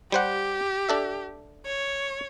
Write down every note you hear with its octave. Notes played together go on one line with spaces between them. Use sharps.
G3 G4 C5 F#5
D4 A4 E5
C#5